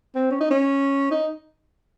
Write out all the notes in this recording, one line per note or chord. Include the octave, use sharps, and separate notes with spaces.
C4
C#4
D#4
C#4
D#4